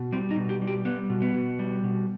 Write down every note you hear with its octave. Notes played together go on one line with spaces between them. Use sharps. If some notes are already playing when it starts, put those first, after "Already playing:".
Already playing: B2
G3 C4
D#4
B2
G4
G3
G4
G3 B3
B2
B3
B2
G3
B2